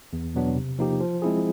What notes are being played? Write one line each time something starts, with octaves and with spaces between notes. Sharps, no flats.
E2
B2 F#3 B3 D4
C3
F3 A#3 D#4 G4
F3
G#3 C4 E4 G#4